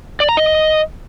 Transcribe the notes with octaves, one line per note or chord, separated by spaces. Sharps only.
D5
A#5
D#5